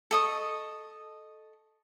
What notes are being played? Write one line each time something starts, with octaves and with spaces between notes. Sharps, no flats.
A4 D#5 C#6